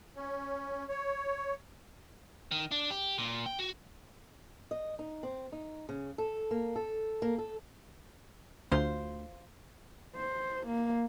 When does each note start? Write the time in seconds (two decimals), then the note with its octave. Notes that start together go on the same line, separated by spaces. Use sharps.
0.16 C#4
0.89 C#5
2.51 D#3
2.71 D4
2.90 G4
3.18 A#2
3.46 G5
3.59 F#4
4.71 D#5
4.99 D#4
5.23 C4
5.52 D#4
5.89 C#3
6.18 A4
6.51 A#3
6.76 A4
7.22 A#3
7.38 A4
8.72 D2 F4 C5
10.16 C5
10.67 A#3